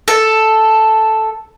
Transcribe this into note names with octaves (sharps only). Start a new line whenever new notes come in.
A4